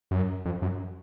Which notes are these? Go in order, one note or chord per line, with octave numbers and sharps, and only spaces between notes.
F#2
F2
F#2